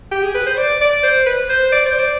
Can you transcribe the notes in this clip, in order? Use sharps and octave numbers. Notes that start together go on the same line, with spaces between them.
G4
G#4
B4
C5
D5
D5
C5
B4
C5
D5
C5
D5